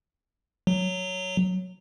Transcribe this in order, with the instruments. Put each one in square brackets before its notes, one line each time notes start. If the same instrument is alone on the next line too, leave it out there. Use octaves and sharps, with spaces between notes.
[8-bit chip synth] F#3